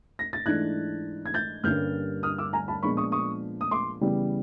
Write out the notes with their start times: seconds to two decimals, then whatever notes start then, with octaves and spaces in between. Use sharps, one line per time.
0.19 A#6
0.33 A6
0.46 G#2 E3 A3 D4 F#6 G#6
1.26 G#6
1.34 G6 A6
1.64 G2 D3 G3 A#3 C#4 F6 G6
2.23 D#6 F6
2.38 D6 E6
2.53 G#5 A#5
2.68 A5 B5
2.83 A#2 F3 G#3 B3 D4 B5 C#6
2.97 C#6 D#6
3.12 C#6 D#6
3.61 D#6
3.71 C6 D6
4.01 C#3 E3 G3 B3